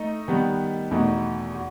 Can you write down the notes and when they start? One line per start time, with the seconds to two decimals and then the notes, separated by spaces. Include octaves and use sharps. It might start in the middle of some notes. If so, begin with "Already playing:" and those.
Already playing: A3 D#4 D#5
0.28 D#3 G3 B3
0.91 E2 B2 A3 D#4 F#4
1.55 F#4